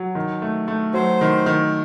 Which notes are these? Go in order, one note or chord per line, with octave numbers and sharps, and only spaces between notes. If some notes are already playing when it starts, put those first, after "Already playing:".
Already playing: F#3
D#3
A3
A3
F#3 C5
D#3
D#3